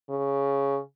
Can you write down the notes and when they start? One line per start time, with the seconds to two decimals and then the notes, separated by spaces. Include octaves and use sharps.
0.09 C#3